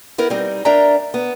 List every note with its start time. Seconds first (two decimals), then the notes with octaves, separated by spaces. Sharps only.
0.18 B3 E4 A#4
0.30 G3 C4 D#4
0.65 D4 A#4 D5 E5 G5 A#5
1.14 B3